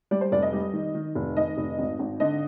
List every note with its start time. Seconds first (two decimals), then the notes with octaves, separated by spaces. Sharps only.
0.11 G3 D5
0.21 C5
0.32 F1 D5
0.42 D#5
0.53 G3
0.73 D#3
0.95 D#3
1.15 F1
1.37 D#3 D#5
1.57 F1
1.79 G#1
1.99 G#1
2.20 D3 D#5